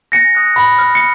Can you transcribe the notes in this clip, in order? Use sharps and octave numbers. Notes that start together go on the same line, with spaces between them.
G#5 A#6 C#7
D#6 F#6
B5
F6
C#7